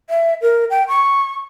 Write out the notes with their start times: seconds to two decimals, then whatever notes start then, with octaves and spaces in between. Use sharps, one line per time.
0.10 E5
0.42 A#4
0.70 G5
0.88 C#6